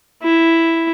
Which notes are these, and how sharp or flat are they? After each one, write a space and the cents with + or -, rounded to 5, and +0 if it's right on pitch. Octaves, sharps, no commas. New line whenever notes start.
E4 +0